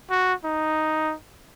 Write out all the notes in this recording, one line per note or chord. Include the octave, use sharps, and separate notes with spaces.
F#4
D#4